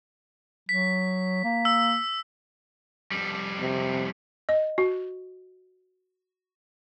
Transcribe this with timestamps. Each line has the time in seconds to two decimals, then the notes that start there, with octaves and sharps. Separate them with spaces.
0.69 F#3 B6
1.44 A#3
1.65 E6
3.12 F2 G3
3.61 C3
4.49 D#5
4.78 F#4